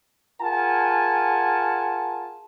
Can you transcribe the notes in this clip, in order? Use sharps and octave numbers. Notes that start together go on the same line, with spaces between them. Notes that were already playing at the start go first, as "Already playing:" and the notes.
F4 G#4 A#4 F#5 G#5 A5